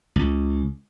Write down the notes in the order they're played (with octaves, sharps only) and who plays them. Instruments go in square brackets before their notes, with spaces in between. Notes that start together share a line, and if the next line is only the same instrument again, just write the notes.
[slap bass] C#2